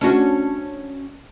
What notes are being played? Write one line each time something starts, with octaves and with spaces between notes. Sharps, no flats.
C#4 D4 F#4